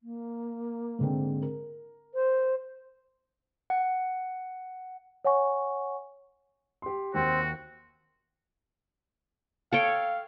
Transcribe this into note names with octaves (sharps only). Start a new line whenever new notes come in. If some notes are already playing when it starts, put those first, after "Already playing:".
A#3
G#2 D3 C4
A#4
C5
F#5
C#5 F#5 G#5 C#6
G4 C6
D#2 C4 F#4
A4 C#5 F5 G5